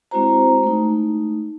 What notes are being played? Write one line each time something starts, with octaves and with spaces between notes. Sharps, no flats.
G#3 C4 E4 F#4 C5 A#5
A3 D#4